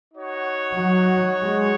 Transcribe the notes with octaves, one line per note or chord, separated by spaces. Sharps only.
D#4 F#4 C#5 F#5
F#3
G#3